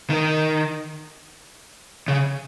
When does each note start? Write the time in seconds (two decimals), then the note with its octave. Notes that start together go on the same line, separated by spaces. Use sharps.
0.10 D#3
2.08 C#3